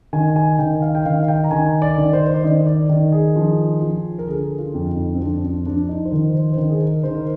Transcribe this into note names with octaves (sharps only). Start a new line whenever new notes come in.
D#3 G#5
G#5
D#3 G5
F5
G5
D#3 F5
F5
G5
A#5
D#3 G#5
D5
D#3
C5
C5
D5
D#3 D#5
D5
D#3
G#4
F3
F3
A#4
D3 G#4
F4
F2
D#4
C4
F3 D4
C4
F3 D4
D#4
C5
D#3 A#4
C5
C5
D#3 A#4
G#4
A#4
D#3 C5
A#4